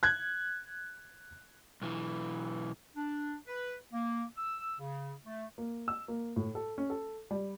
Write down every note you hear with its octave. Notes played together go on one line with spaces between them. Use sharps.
F#6 G#6
B1 E3
D4
B4
A#3
E6
C#3
A3
A#3
E6
A#3
A2
A4
C#4
A4
G3